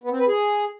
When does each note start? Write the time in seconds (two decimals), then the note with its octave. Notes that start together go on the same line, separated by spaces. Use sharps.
0.04 B3
0.12 C4
0.20 B4
0.28 G#4